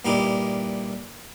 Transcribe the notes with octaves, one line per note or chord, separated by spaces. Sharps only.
G2 A#2 G3 D#4 E4 G4